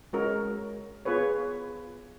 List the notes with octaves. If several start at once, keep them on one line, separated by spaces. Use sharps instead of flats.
G#3 C#4 F#4 A#4
B3 F4 G#4 B4 C#5